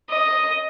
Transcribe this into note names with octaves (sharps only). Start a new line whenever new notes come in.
D#5